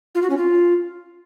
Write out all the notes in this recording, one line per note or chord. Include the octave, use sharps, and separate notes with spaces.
F4
F#4
C#4
F4